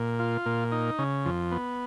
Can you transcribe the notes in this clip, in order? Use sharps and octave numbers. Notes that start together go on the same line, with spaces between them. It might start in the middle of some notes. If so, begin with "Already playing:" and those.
Already playing: A#2
F4
A#2
D#4
C#3
F2
B3